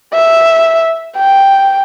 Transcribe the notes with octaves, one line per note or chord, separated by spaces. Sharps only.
E5
G5